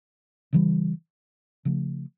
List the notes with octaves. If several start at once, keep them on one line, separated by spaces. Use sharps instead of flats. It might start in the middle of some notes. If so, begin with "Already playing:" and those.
C#3 E3 G3
C#3 F3 A3